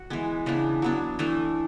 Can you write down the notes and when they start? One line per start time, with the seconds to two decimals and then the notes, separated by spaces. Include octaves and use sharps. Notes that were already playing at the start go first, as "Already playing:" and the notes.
Already playing: F#4
0.10 E3 G#3 B3
0.46 C#3 E3 B3 D4
0.82 F#3 B3 D4
1.19 E3 A3 D4